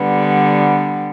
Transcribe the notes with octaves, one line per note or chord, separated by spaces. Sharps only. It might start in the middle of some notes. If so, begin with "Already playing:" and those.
Already playing: D3 G3 B3